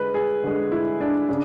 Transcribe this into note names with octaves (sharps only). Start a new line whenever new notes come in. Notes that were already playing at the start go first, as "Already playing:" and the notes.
Already playing: D3 G#3 B4
G#4
D3 G#3
E4
D4
C#3 D4